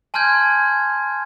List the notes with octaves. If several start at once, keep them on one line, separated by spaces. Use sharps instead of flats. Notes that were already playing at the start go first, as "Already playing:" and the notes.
G#5 A5 C6 F6 G6 G#6